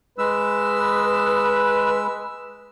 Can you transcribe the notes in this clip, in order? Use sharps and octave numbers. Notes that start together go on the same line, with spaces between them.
G#3 B4 E6